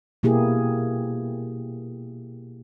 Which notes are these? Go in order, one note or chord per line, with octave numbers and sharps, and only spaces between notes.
B2 A#3 E4 G4 G#4